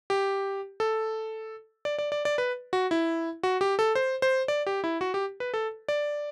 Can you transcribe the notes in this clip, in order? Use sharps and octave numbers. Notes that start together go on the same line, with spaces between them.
G4
A4
D5
D5
D5
D5
B4
F#4
E4
F#4
G4
A4
C5
C5
D5
G4
E4
F#4
G4
B4
A4
D5